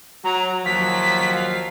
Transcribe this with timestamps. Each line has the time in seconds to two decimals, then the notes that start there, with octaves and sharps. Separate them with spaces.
0.24 F#3 A#5
0.65 D#2 F3 F#3 B6
1.33 F5